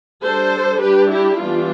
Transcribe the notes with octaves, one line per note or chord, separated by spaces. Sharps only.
G3 D4 A4 C5
G3 D4 G4 B4
E4 G4
E3 G3 B3 D4 F4